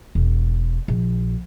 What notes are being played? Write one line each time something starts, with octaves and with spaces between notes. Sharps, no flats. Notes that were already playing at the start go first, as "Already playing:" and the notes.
E1
A#1